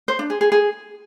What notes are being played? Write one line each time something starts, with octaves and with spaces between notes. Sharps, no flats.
C5
D4
G#4
G#4
G#4